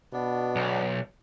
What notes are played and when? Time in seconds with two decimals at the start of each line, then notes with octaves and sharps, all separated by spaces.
0.13 B2 B3 D4
0.56 B1